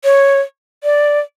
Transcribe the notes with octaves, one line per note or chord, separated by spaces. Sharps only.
C#5
D5